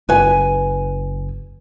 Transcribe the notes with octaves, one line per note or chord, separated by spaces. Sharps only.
F#1 B4 G#5